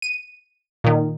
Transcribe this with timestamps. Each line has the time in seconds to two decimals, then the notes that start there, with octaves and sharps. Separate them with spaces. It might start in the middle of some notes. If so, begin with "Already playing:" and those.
0.02 D#7
0.84 A#2 D#3